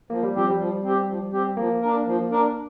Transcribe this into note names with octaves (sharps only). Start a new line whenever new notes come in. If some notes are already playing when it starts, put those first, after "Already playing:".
F3 A#3
G3
F3 C4 G4
G3
F3
C4 G4
F3
C4 G4
F3 A#3
D4 A#4
F3
D4 A#4